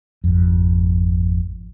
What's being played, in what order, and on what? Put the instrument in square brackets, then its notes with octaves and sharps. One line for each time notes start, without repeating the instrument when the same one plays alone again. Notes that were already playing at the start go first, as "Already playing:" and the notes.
[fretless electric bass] G#1 F2